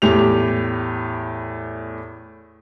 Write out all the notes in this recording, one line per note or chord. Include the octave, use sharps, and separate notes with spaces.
E2 A2 G4 F7